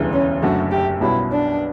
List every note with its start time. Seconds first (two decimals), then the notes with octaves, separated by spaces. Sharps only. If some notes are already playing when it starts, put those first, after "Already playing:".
Already playing: E1 D2 C#3 E3 G3
0.12 C#4
0.42 F#1 F#2 D3 A3 F#4
0.71 G4
1.01 B1 B2 G3 C#4 E4 F#4
1.31 D4